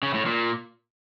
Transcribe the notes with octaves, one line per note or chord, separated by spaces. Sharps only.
C#3
A2
A#2